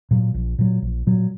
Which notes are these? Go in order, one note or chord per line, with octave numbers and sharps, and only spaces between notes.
A#2 F#3
A#1
A#2 F#3
A#1
A#2 F#3